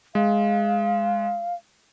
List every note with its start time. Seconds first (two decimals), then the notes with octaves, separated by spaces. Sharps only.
0.15 G#3 F5